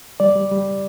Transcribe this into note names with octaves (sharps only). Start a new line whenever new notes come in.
G3 D5
G3
G3